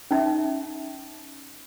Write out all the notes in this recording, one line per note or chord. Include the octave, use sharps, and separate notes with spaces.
C#4 D#4 E5